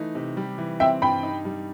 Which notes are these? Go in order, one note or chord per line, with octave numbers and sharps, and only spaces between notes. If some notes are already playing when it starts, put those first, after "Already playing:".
Already playing: E3 A3 D#4
C3
G3
E3
C4 E5 G5
G2 G5 B5
D#4
G3